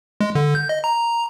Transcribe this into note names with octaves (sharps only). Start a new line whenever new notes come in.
G#3
D3
G6
D#5
A#5